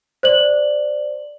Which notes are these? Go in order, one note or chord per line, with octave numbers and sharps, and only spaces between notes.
C5 D5 F#7